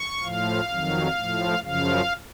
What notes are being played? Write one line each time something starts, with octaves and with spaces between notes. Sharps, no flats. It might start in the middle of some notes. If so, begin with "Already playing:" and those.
Already playing: C#6
A2 F3 F5
F2 D#3 F#3
A2 F3
F#2 C#3 F3 F5